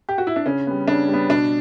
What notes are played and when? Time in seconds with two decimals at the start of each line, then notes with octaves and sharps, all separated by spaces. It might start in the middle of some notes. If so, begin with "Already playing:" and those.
0.09 G4
0.18 F#4
0.27 E4
0.36 D4
0.46 C#3 C#4
0.67 G3 B3
0.88 C#3 D4
1.08 G3
1.13 B3
1.29 B2 D4